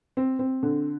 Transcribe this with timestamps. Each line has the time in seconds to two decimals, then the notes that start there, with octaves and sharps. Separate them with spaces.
0.17 C4
0.39 C4
0.63 D3